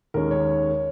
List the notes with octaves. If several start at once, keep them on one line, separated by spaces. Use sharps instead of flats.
D#2 D#3 G#3 C#4 A#4
C#5